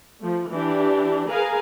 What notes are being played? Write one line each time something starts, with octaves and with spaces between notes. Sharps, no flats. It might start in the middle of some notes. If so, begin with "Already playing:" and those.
F3 A3
E3 D4 G4
G#4 A#4 B4 F5 G#5 A#5